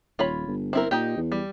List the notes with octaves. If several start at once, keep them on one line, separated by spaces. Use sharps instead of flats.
D#1 F4 C#5 B5
G1
C4 E4 A#4
A#2 D#4 G4
E2
G3